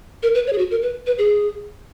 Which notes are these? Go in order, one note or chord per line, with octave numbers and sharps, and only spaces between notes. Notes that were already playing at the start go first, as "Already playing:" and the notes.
A#4
B4
C#5
G#4
F#4
A#4
B4
B4
G#4